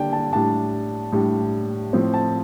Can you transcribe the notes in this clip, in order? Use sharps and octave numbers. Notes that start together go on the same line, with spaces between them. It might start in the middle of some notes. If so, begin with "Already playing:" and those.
Already playing: D3 G3 A#3 D5 G5 A5
A5
A2 G3 D4 A5
A2 G3 D4
A2 F3 C4
A5